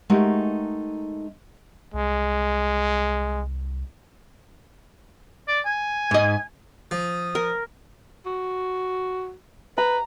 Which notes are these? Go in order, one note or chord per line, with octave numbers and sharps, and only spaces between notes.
G#3 A3 D#4 F#4 G4 A#4
C2 G#3
D5
G#5
G#2 D#5
F3 D#6
A#4
F#4
B4 A#5